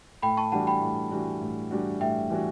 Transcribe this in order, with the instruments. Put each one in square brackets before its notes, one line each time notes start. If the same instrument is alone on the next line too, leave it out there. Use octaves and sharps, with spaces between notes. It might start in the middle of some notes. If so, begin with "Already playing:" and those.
[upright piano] A2 [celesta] G5 B5
[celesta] A5 C#6
[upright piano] E3 G3 D4 F#4 [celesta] F#5 A5
[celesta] G5 B5
[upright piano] A2
E3 G3 D4 F#4
A2
E3 G3 D4 F#4
[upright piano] A2 [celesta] E5 G5
[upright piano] E3 G3 D4 F#4